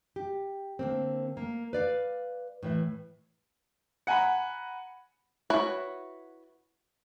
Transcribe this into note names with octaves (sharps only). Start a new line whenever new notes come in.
G4
D3 A#3 C4
A#3
B4 D5 F5
A2 E3 E5
F#5 G#5 A#5 B5
E4 F#4 B4 C#5